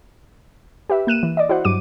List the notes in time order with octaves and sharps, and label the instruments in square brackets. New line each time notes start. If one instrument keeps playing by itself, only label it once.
[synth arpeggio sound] G4 B4 E5
A#3 F#6 D#7 E7
E3
D5 D#5
E4 F#4 C5 F#5
G2 F#3 D6 D#7